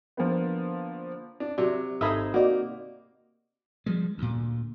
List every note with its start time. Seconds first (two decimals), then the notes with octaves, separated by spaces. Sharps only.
0.17 D3 F3 A#3 B3
1.40 D4
1.58 C3 F#3 D5
2.01 G#1 D#4 A4 C5 E5 B5 D#6 G#6
2.34 A#3 F#4 D5 D#5
3.86 F3 G3 G#3
4.18 D2 A#2